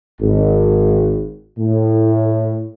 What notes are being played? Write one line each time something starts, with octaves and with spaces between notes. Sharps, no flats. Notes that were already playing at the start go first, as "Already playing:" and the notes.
G#1
A2